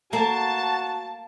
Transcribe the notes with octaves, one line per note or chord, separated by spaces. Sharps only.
A#3 F#4 A5